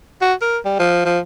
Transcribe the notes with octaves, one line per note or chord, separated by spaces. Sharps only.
F#4
A#4
G3
F3
F3